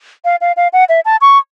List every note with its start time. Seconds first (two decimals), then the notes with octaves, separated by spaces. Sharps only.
0.25 F5
0.41 F5
0.57 F5
0.73 F#5
0.89 E5
1.05 A5
1.21 C#6